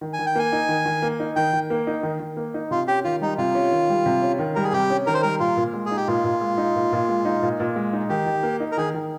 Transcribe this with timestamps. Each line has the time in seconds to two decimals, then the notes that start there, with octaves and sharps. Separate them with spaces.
0.01 D#3
0.13 G#5
0.19 D#3
0.26 G5
0.35 A#3 G#5
0.53 D#4
0.69 D#3
0.86 D#3
1.02 A#3
1.20 D#4
1.36 D#3 G5
1.53 D#3
1.70 A#3
1.87 D#4
2.03 D#3
2.20 D#3
2.37 A#3
2.54 D#4
2.71 C3 F4
2.88 C#4 G4
3.04 D#3 F4
3.21 G3 D#4
3.38 C3 F4
3.55 C#4
3.72 D#3
3.89 G3
4.06 C3
4.22 C#4
4.39 D#3
4.55 G3 A#4
4.64 G#4
4.73 C3 G4
4.90 C#4
5.07 D#3 A#4
5.14 C5
5.22 G3 A#4
5.40 A#2 F4
5.57 A#2
5.73 G#3
5.86 G#4
5.91 D#4
5.97 G4
6.07 A#2 F4
6.24 A#2
6.41 G#3
6.58 D#4
6.76 A#2
6.92 A#2
7.08 G#3
7.25 D#4
7.43 A#2
7.60 A#2
7.76 G#3
7.93 D#4
8.09 D#3 G4
8.26 D#3
8.43 A#3
8.60 D#4
8.72 A#4
8.77 D#3 G#4
8.94 D#3